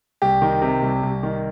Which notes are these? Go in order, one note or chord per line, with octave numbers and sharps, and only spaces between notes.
C2 G4
D#3
C3
C2
C2
D#3